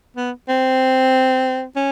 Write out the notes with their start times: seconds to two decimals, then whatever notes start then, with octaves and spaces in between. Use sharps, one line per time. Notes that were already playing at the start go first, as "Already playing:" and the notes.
0.16 B3
0.49 C4
1.76 C#4